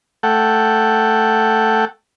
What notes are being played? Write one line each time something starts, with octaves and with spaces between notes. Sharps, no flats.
A3 A4 F#5 G5